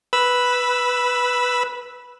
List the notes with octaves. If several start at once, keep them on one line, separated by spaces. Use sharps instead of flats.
B4 B5 E6